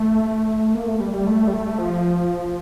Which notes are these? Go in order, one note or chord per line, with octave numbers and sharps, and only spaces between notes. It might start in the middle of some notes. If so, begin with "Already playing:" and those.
Already playing: A3
A#3
A3
G3
G3
A3
G3
A3
F3